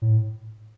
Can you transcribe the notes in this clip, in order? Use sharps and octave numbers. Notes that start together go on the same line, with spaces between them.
A2